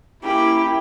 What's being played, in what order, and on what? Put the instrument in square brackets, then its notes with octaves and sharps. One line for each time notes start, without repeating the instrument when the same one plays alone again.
[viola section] A#3 C#4 B5 [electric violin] E4 [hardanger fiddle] G4